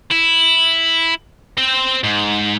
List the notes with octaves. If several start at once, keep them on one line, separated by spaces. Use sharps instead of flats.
E4
C4 C5
G#2